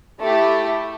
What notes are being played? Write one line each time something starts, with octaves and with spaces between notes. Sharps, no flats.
A3 E4 G4